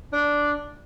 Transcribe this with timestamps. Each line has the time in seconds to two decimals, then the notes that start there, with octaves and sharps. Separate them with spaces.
0.13 D4